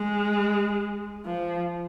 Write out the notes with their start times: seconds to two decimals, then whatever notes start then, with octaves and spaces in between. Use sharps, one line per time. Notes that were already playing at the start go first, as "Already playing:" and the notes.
Already playing: G#3
1.25 F3